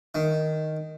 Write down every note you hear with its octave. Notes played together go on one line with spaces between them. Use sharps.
D#3